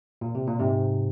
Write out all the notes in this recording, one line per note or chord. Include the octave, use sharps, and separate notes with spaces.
A#2
C3
A#2
G#2 C3